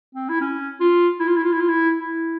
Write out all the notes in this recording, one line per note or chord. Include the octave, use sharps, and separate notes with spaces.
C4
E4
C#4
F4
E4
F4
E4
F4
E4
F4
E4
E4